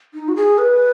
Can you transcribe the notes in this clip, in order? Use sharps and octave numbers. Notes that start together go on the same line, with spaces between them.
D#4
F#4
G#4
B4